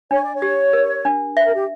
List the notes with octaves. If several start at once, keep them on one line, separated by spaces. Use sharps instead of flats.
D4 C#5
D5
C#5
G4
A#4
D4
B4 E5
A#4
G4